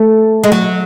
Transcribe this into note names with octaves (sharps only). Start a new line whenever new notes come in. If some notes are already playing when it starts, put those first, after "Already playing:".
Already playing: A3
G#3
F#3